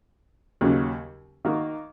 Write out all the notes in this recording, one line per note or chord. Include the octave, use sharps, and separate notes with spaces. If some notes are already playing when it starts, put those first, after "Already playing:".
D#2 C#3 F#3
D#3 A#3 F#4